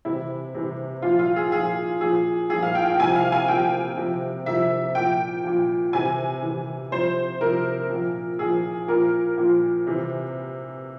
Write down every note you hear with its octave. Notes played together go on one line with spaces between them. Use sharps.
C3 E3 E4
C3 E3
A#2 F3 F4
F4
G#4
A#2 F3 G#4
A#2 F3 G#4
A#2 F3 G#4
F5
G5
G5
C3 F3 G#5
F5
G#5
C3 F3 G5
C3 F3
C3 F3 E5
A#2 F3 G5
A#2 F3
C3 E3 G#5
C3 E3
C3 F3 C5
C3 F3 A#4
A#2 F3
A#2 F3 G#4
A#2 F3 A#4
A#2 F3
C3 E3